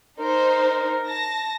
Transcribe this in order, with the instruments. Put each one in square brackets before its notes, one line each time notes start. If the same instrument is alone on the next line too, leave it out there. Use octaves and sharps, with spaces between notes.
[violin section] D#4 C5 [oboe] A#4
[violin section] A5 A#6